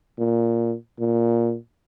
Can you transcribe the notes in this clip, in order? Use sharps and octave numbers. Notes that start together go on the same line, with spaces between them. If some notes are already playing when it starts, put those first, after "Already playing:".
A#2
A#2